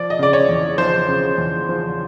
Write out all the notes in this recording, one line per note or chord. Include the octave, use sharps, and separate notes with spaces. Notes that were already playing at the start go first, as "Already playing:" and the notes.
Already playing: F3 D5
D#5
C#3 D5
C#5
E2
F3 C5
C#3
E2
F3